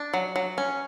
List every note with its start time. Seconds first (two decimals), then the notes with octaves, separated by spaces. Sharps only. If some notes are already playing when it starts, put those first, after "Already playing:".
Already playing: D4
0.13 F#3
0.36 F#3
0.58 C#4